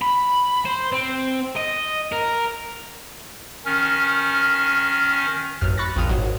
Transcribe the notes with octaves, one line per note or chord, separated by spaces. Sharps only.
B5
C5
C4
D#5
A#4
D#3 C#4 F6
A1 F#2 F6
B5 C#6 F#6 A6 A#6
A#1 F2 A#2 D#6 F6
G#1 F#3